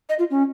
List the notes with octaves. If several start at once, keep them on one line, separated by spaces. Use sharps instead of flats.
D#5
F4
C#4